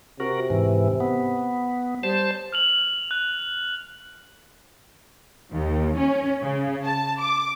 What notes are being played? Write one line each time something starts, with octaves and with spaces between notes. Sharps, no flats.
C3 F#4 A#4
G#2 E3
B3
G3 C5 A5
F6 F7 F#7
F#6
D#2
C#4
C#3
A5
D6